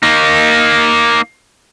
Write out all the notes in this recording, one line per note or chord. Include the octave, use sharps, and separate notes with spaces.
A#3 D#4